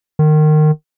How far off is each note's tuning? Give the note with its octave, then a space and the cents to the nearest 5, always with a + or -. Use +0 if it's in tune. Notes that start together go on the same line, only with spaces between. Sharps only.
D#3 -25